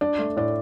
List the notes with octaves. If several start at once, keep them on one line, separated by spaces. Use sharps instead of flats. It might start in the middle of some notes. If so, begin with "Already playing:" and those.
D4 D5
A3
A2 D5